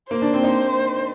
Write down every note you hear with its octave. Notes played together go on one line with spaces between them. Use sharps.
A#3 C5
D4
C4
D#4